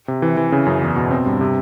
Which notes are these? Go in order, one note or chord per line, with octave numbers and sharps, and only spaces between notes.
C3
E3
E3
C#3
F#2
E2
B2
C4
G2
C3